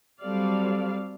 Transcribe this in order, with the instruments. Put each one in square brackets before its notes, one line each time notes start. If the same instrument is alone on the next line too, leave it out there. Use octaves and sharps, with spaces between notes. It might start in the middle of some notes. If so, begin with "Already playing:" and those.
[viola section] F#3 G3 C4 A4 D5 F5